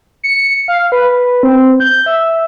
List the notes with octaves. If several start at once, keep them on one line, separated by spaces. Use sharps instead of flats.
C#7
F5
B4
C4
G6
E5